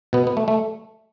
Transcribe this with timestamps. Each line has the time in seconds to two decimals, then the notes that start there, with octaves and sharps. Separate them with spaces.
0.13 B2 B3
0.27 B3
0.37 A3
0.48 A3